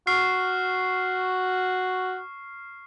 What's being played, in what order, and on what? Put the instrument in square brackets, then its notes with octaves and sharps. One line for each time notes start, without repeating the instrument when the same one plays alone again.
[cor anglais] F#4 [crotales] C#6 F6 C7